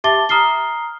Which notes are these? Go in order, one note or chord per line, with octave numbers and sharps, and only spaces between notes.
G4 E5 A5 D6 A6 G7
A#5 D#6 F6 C7 G7